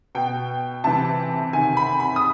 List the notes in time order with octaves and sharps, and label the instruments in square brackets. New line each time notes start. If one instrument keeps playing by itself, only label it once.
[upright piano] B2 G5
C3 E3 A5
C3 D#3 G#5
B5
B5
D#6